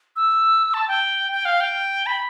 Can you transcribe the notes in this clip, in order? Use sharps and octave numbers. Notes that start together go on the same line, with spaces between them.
E6
A5
G5
G5
F5
G5
B5